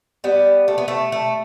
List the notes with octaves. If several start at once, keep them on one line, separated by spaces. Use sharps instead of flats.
G3 B3
A3
B3
A3
A3